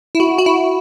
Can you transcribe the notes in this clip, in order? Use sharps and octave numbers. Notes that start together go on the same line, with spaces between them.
E4
F#4
F#4
E4